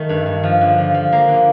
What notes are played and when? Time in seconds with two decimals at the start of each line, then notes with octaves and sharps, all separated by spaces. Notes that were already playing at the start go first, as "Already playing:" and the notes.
Already playing: D#3 A3
0.09 G2
0.26 G2
0.43 F3
0.61 D3
0.78 F3
0.94 F3
1.12 A#3
1.28 D3